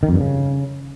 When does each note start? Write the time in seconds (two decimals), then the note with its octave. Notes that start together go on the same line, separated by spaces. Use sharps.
0.03 D#3
0.09 F2
0.14 G2
0.20 C#3